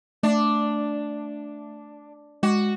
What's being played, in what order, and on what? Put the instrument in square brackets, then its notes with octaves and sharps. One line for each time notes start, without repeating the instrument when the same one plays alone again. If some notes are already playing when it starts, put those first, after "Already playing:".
[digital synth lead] A3 [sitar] D4
[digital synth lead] G#3 [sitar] F#4